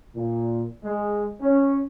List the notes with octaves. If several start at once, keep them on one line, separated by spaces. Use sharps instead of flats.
A#2
G#3
C#4